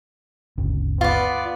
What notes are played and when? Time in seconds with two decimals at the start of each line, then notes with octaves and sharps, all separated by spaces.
0.58 G1 D2 C#3
1.01 B3 F4 D5